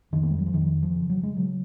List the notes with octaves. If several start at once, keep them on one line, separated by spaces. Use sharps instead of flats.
F2 D#3
A#3
G#3
F#3
F3
F2 D#3
F3
C#3
F#3
G#3
C#3 F#3